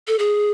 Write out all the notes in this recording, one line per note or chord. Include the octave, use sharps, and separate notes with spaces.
A4
G#4